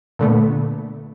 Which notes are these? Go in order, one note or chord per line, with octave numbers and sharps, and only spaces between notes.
A#2 D3 A3 B3